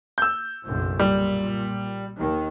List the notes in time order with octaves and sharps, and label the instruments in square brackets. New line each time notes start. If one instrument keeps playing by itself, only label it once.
[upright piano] E6 G6
[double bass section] F#1 B1 F#2
[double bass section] A#2 [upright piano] G3
[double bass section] D#2 D#3